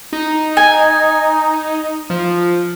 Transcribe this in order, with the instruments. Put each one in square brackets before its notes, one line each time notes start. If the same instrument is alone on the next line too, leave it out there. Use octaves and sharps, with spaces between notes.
[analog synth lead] D#4
[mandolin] G#5
[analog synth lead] F3